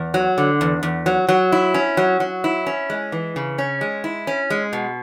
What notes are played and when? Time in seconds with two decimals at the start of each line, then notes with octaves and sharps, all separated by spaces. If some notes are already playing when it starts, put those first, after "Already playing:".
Already playing: E2
0.14 F#3
0.38 D3
0.61 E2
0.83 E2
1.06 F#3
1.29 F#3
1.52 E4
1.74 C#4
1.97 F#3
2.20 F#3
2.44 E4
2.67 C#4
2.90 G#3
3.12 E3
3.36 C#3
3.58 C#4
3.81 G#3
4.04 E4
4.27 C#4
4.50 G#3
4.73 B2